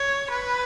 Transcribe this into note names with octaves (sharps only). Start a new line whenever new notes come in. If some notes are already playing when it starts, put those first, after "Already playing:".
Already playing: C#5
B4